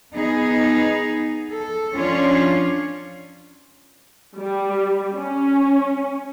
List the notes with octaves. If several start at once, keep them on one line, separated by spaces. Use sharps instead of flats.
B3 D#4 G#4
A4
F3 C#4 D4 F4 C#5
G3
C#4